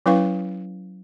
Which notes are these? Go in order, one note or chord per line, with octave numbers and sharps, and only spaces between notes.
F#3 C#4 E4 B4 F5 C#6